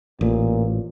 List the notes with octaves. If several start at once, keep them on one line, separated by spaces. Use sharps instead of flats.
A1 A#2